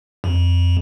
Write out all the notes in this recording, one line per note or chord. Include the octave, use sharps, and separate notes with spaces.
F2